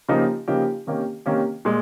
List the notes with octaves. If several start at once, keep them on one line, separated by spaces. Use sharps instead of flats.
C#3 F3 A#3 D#4 G4
C#3 F3 A#3 D#4 G4
C3 D#3 A#3 C#4 G4
C3 D#3 A#3 C#4 G4
A#2 G#3